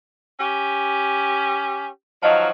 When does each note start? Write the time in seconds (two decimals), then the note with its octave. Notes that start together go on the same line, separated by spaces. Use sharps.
0.39 C#4 G4
2.23 D#3 F3 F#3 D#5 F5 A5